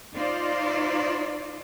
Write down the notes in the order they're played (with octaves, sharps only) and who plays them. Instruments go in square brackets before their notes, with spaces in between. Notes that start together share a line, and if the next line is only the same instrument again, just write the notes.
[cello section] D#4 F4 C5 D5